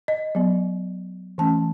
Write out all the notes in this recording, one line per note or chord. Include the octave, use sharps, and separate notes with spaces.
D#5
F#3 B3
E3 A3 C#4 A5